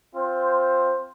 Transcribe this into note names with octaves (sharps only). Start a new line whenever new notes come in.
C4 F4 C5